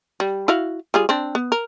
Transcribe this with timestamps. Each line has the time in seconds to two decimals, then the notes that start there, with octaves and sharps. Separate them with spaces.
0.20 G3
0.48 E4 F#4 F5
0.94 G3 F4 G#4
1.09 C4 D4
1.35 B3
1.52 A#4